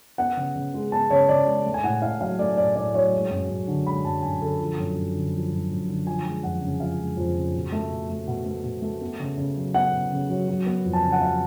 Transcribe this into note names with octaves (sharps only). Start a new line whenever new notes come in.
B3 F#5
C#3
C#3
G#3
B3 A5
C#3 C#5
C#3 D5
G#3
A3
G#5
A2 F#5
A2 F5
F#3 F5
A3 D5
A2 D5
A2 D5
F#3 C#5
G#3
F#2
F#2
D3
G#3 B5
F#2 A5
F#2 G#5
D3 A4
F3
F#2
F#2
D3
F3
F#2
F#2
D3
F3 G#5
G#3
F2 F#5
C#3
F3 F5
G#3
F2
C#3
B2
A3
B2
A3
B2
A3
B2
A3
B3
C#3
C#3
F#3
B3 F#5
C#3
C#3
F#3
F#3
B3
F2
A5
C#3 G#5
F#5
F#3 F5